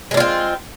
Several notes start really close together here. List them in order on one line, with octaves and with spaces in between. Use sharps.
G#3 D4 F4 C4